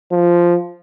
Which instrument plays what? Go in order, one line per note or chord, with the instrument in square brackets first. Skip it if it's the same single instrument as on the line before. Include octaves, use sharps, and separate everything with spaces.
[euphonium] F3